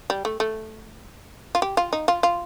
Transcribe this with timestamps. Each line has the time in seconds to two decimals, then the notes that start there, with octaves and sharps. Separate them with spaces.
0.10 G3
0.25 A3
0.40 A3
1.55 F4
1.62 G4
1.77 F4
1.93 D#4
2.08 F4
2.23 F4